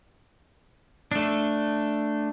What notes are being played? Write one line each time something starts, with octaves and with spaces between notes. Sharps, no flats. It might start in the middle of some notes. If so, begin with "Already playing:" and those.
A3 D4